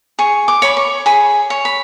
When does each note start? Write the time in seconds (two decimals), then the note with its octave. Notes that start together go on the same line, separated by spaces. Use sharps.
0.19 G#4 C#6
0.48 D6
0.62 C#5 B5
0.77 C#6
1.06 G#4 B5
1.50 C#5
1.65 B5